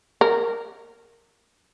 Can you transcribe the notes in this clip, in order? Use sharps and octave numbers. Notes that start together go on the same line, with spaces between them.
A#4